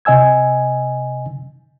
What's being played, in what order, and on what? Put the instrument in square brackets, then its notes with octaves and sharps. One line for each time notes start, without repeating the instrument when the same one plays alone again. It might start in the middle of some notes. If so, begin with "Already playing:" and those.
[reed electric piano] C3 D#5 G#5 E6 G#6